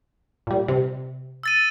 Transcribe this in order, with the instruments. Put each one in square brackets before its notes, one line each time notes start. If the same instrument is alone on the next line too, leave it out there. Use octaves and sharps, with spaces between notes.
[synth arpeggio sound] A#2 G3
C3
[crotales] E6 A6 D#7